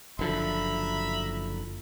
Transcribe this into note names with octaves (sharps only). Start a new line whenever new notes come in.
F#1 D3 F3 E5 A#5 B5